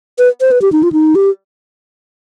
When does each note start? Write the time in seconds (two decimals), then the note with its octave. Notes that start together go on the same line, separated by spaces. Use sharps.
0.19 B4
0.41 C5
0.51 B4
0.62 G4
0.72 D#4
0.83 F4
0.92 D#4
1.15 G4